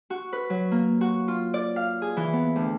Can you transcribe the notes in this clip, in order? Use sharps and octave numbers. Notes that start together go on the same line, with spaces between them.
F#4
B4
F#3
A#3
F#4
F4
D5
F5
G#4
E3
B3
D2